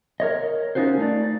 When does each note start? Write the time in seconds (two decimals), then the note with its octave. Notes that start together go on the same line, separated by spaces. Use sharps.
0.20 A#4 C#5 D#5
0.75 C#4 D#4 F4 F#4 C5
0.98 A3 D#4 D5